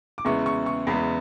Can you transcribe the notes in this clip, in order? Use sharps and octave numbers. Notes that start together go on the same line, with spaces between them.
D6
E2 C#3 G#3 B3 E4 C#6
C#6
C#6
E2 C#3 G#3 B3 E4 B5